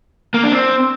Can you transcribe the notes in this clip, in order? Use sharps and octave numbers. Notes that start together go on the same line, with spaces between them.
A#3
D4
C4